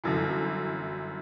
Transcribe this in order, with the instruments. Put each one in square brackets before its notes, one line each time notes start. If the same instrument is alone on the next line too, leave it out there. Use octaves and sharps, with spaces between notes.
[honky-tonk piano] G1 F#2 E3